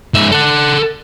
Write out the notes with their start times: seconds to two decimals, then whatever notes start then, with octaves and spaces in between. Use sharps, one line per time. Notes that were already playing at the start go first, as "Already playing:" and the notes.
0.14 G#2 E5
0.32 A4 F#5